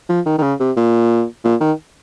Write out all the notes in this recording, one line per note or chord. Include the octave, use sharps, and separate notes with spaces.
F3
D#3
D#3
C#3
C3
A#2
A#2
D#3